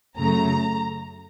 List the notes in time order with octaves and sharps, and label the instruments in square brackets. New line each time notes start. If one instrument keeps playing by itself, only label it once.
[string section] F#2 C#3 F#3 A3 A#5